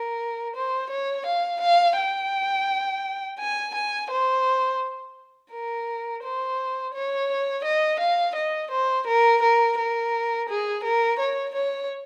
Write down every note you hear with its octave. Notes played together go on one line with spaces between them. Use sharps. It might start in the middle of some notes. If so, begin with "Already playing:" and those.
Already playing: A#4
C5
C#5
F5
F5
G5
G#5
G#5
C5
A#4
C5
C#5
D#5
F5
D#5
C5
A#4
A#4
A#4
G#4
A#4
C#5
C#5